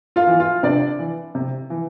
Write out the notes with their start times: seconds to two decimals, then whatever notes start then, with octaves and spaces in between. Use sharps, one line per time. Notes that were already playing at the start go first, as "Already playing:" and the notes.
0.16 F4 F5
0.27 E3
0.40 F4 F5
0.63 C3 D4 D5
0.99 E3
1.35 C3
1.70 E3